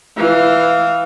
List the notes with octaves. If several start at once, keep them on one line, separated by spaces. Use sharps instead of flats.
E3 F5